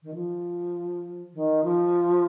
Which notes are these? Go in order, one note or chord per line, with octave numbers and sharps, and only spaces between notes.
D#3
F3
D#3
F3